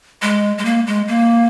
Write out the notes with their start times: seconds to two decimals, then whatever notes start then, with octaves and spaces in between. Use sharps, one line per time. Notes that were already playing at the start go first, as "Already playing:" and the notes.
0.22 G#3
0.58 G#3
0.65 A#3
0.87 G#3
1.08 A#3